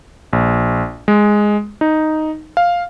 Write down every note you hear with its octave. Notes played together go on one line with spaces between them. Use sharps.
A#1
G#3
D#4
F5